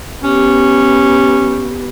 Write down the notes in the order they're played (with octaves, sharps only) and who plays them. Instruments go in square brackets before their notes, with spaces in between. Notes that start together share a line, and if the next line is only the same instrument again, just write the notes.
[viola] B3 G4 [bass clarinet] C#4